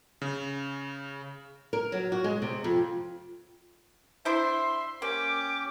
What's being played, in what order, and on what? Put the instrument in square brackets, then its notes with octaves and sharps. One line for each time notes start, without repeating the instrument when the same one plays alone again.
[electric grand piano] C#3
[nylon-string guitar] A#4
F#3
F#4
G#3
C3
F2
[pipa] D4 E4 C5 [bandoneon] E5 [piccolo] C6
[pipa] A#3 [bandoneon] C#4 G4 G5 [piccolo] D6